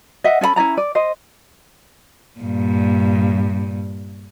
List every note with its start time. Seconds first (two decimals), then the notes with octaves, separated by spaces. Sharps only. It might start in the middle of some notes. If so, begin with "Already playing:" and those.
0.24 D#5 E5 F#5
0.41 C#4 A4 D#5 B5
0.56 C#4 E4 D5 A#5
0.77 D5
0.95 C5 D#5
2.40 G2 A#2